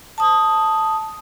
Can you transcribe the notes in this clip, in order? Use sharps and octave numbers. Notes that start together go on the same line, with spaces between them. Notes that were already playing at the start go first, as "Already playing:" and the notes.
A5 D#6